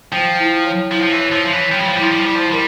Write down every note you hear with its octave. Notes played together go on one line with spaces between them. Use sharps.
F3 G5
E4
C#5
F3 E4
F3
E3
C#5
F3
F3 C#5
E3
F3 G5
G3
F3
G3
F3 E4
G3
F3
G3 E4
F3
G3 A#4